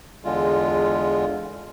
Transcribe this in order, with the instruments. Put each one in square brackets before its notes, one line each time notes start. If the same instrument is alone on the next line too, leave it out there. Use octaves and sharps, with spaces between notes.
[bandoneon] E2 D3 G#3 F4